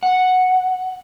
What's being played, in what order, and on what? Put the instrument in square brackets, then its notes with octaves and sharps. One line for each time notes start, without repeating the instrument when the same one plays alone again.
[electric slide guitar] F#5